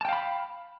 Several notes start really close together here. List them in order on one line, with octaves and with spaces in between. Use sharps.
A5 G5 F5 B5